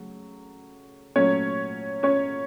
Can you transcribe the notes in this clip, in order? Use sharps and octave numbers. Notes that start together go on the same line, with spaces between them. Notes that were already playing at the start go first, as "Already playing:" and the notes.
Already playing: C#3 F#3 A3
A#2 F#3 A3 C#4 C#5
C#4 C#5